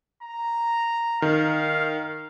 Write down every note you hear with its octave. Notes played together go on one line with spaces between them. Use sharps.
A#5
D#3 F5